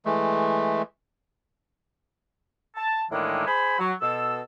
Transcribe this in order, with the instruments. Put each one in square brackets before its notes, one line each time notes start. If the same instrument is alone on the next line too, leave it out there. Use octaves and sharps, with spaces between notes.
[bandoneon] E3 G#3 A3
[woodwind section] A5
A2 D#3 E3 G#3 A#3 D4
G#4 C5 G#5 B5
F#3
B2 A4 E6